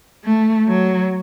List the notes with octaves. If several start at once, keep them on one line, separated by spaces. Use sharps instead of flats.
A3
F#3